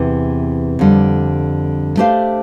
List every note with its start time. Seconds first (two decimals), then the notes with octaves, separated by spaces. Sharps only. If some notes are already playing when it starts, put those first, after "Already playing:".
Already playing: E2 C3 E3
0.79 F2 D3 G3
1.97 A3 D4 G4 C5 F5